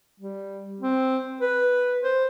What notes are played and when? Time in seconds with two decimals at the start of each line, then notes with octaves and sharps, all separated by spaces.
0.20 G3
0.81 C4
1.41 B4
2.03 C5